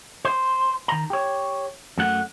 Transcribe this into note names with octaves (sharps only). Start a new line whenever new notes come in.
C5
D#3 A#5
G4 C#5
F#2 A3 F#5